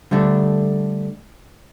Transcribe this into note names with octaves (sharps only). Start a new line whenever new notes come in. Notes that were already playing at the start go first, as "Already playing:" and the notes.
D3 G3 A3 D4